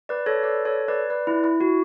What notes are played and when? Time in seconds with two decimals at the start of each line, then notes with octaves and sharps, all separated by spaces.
0.09 B4 D5
0.26 A4 C#5
0.43 B4 D5
0.65 A4 C#5
0.88 B4 D5
1.10 B4 D5
1.27 E4
1.44 E4
1.61 F#4